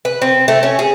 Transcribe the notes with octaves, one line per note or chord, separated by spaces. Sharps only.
B4
C4
A3
C#4
G#4